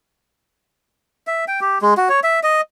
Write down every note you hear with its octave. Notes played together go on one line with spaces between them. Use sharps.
E5
G5
G4
G#3
F#4
C#5
E5
D#5